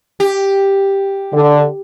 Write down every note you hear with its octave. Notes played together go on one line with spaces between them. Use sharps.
G4
D3